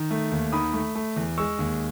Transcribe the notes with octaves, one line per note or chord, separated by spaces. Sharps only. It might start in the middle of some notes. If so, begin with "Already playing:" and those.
Already playing: D#3
A3
D#2
D#3 B5 D#6
A3
A3
E2
G#3 C#6 E6
D#2